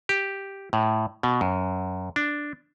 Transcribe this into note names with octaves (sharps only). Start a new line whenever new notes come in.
G4
A2
B2
F#2
D4